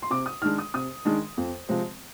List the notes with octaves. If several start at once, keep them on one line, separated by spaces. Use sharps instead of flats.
C6
C3 D6
D#6
D#3 G#3 D4 F6
D#6
C3 D#6
D#3 G#3 D4
F2
C3 F3 G#3 C4